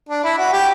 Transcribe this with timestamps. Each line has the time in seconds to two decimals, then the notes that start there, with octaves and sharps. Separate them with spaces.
0.09 D4
0.24 E4
0.38 F#4
0.53 G4